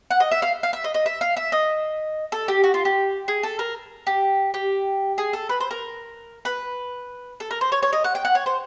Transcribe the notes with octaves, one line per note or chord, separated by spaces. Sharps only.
F#5
D#5
E5
F5
F5
E5
D#5
D#5
E5
F5
E5
D#5
A4
G4
F#4
F4
G4
G#4
A4
A#4
G4
G4
G#4
A4
B4
C5
A#4
B4
A4
A#4
C5
C#5
C#5
D#5
F#5
G5
F#5
C#5
C5